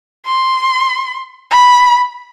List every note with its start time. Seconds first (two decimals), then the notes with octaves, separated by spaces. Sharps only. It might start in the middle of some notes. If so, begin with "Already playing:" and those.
0.26 C6
1.51 B5